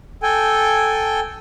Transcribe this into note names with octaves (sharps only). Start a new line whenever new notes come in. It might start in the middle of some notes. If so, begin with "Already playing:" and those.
A4 G5 G#5